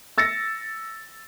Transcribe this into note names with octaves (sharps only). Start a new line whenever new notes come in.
E6 A6 A#6 C#7